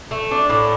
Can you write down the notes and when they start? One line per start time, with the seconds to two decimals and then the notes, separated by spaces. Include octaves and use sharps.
0.11 A3
0.31 D4
0.49 A2